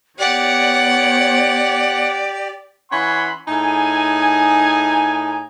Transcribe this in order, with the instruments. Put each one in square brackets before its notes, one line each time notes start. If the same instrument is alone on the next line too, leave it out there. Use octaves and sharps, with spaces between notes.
[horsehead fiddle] B3 C#5 [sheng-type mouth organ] G4 [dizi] D5 [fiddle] F#5
[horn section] E3 C#4 F#5 B5 C6
A2 D#4 G#4 G#5